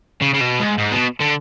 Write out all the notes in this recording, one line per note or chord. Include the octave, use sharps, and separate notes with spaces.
C#3
C#3
B2
G#2
G#2
B2
D3